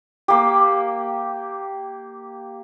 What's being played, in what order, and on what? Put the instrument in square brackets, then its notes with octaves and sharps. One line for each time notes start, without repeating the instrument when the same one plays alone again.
[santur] A#3 G4